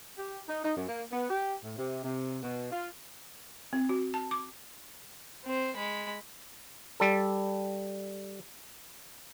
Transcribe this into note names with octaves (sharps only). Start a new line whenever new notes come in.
G4
D#4
D#4
F#2
A#3
B3
G4
A2
C3
C3
B2
F4
C4
F#4
A5
D6
C4 C5
G#3 B5
G3 A4